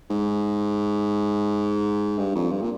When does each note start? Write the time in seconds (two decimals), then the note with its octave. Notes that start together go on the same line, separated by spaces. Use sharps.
0.10 G#2
2.18 G2
2.35 F2
2.51 G2
2.62 A#2